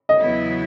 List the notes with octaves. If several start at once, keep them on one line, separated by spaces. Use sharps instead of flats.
D#5
E2 C#3 F#3 B3 E4